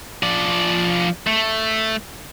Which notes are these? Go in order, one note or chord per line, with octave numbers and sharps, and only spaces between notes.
F3 D5
A3